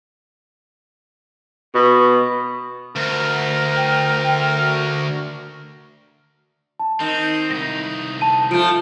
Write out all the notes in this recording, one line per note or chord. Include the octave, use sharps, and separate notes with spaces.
B2
D2 A#4
G5
F#4
A5
D#3 C4
C2 D#4 A#6
A5 D#7
F3 A3 F4 D7